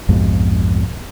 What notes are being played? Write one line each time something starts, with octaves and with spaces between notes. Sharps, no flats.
B1 F2 G#2